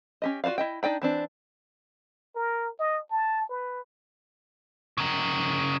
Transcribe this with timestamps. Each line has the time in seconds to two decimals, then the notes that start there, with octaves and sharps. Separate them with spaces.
0.22 C#4 G4 D#5
0.44 F4 F#4 C5 D5 F5
0.58 E4 D#5 G5
0.83 D4 D#4 D5 G5 B5
1.02 E3 C4 D4
2.36 A#4
2.80 D#5
3.11 A5
3.49 B4
4.98 C#3 A#4